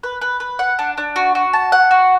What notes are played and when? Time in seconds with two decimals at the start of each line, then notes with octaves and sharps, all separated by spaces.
0.03 B4
0.21 B4
0.40 B4
0.59 F#5
0.79 D4
0.97 D4
1.16 F#4
1.35 F#4
1.53 A5
1.72 F#5
1.91 F#4